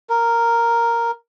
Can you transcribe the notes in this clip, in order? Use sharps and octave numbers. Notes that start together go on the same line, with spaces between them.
A#4